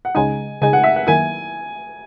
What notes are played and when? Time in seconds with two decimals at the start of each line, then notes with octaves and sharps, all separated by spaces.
0.05 F#5
0.15 C#2 C#3 G#3 D#4 G#5
0.61 C#2 C#3 G#3 D#4 G#5
0.73 F#5
0.84 E5
0.96 F#5
1.07 F#2 D#3 A#3 E4 G#5